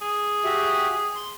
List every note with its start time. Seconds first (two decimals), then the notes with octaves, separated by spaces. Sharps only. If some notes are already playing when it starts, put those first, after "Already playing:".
0.01 G#4
0.45 F#4 G4 E5
1.16 C6